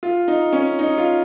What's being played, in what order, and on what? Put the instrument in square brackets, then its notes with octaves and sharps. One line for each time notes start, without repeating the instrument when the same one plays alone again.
[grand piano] F4
D#4
C#4
D#4
F4